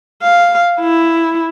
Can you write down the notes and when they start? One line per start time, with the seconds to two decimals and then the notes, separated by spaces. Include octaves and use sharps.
0.23 F5
0.80 E4